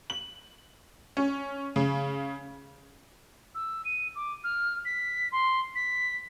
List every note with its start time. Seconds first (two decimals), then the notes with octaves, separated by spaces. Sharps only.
0.10 F#7
1.17 C#4
1.76 C#3
3.55 E6
3.85 D#7
4.16 D6
4.44 F6
4.85 B6
5.32 C6
5.75 B6